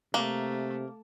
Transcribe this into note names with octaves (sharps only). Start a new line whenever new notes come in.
C3 A3 A#3